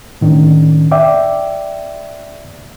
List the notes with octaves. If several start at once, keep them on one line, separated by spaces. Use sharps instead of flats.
A2 D#3 C#4 D4
D5 E5 G5 D6